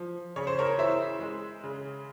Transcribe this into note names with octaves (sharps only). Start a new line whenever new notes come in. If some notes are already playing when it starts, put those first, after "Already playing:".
Already playing: F3
C#3 C#5
C5
A#4 C#5
E3 C5 E5
G#3
C#3